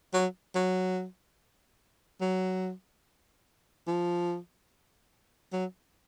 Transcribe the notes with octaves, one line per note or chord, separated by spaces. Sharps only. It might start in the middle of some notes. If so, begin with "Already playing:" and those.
F#3
F#3
F#3
F3
F#3